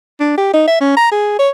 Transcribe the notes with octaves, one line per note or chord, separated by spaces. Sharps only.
D4
G4
D#4
E5
C#4
A#5
G#4
C#5